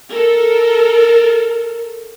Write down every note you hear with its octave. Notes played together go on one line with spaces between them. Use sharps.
A4 A#4